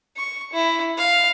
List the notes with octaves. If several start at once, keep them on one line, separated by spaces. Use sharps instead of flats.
C#6
E4
F5